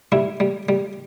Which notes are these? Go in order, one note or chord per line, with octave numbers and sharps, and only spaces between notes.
G3 E4
G3
G3